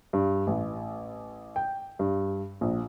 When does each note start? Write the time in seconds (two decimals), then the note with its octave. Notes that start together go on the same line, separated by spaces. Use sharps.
0.13 G2
0.47 A1
1.56 G5
1.99 G2
2.61 A#1